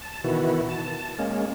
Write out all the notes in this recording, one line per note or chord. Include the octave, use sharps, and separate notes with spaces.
A5
B2 D#3 E3 E4 F#4
A5
G#3 A#3 C#4